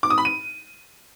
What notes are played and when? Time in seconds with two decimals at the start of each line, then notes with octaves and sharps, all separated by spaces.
0.03 D6
0.10 D#6
0.18 B5
0.25 D#7